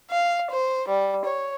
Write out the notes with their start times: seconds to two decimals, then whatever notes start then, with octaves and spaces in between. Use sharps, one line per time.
0.11 F5
0.50 C5
0.87 G3
1.25 C#5